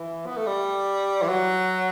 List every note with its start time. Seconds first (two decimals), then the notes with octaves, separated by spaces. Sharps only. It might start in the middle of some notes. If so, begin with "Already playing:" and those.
Already playing: E3
0.26 B3
0.36 A3
0.46 G3
1.22 E3
1.28 F#3